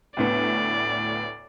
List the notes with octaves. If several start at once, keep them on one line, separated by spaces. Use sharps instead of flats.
D2 A2 B3 D5